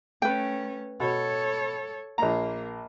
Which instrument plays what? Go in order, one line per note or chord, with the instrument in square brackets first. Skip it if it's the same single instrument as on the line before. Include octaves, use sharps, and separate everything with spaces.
[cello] A3 C#4 [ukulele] B4 G5
[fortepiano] B2 [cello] A4 C#5
[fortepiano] A#1 A#5 [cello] A#3